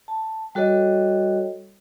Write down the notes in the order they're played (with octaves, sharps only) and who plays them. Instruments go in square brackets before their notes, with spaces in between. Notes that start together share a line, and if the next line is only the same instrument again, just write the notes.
[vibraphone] A5
G3 F#4 A4 C#5 D#5